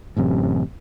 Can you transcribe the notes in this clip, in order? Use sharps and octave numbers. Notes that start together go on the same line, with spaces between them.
A1 F#2 C3